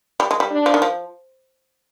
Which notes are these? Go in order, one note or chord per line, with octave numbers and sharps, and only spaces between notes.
G3
G#3
G3
D4
F3
D#3
F3